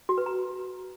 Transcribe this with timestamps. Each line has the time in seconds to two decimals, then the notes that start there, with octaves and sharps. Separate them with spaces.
0.09 F#4
0.18 B4
0.26 A#5